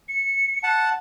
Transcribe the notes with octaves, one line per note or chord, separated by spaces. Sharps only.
C#7
F#5 A5